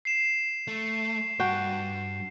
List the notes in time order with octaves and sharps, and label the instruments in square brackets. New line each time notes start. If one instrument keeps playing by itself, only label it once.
[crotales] C7 E7
[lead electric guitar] A3
[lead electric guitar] G2 A5 [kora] F#4 G5